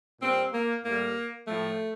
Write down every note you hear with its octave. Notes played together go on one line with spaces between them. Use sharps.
A#2 G3 C4
A#3
A2 G3 A#3
A2 F3 A3